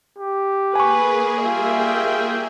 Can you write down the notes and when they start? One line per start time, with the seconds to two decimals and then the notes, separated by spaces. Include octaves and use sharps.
0.18 G4
0.75 A#3 G#4 B4 G#5 C#6
1.44 G3 F4 E5 G5